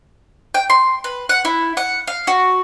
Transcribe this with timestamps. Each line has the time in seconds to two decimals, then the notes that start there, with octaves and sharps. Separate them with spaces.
0.54 G5
0.70 C6
1.04 B4
1.29 F#5
1.45 E4
1.77 F#5
2.07 F5
2.27 F#4